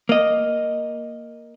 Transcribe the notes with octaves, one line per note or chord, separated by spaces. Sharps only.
A#3 D#5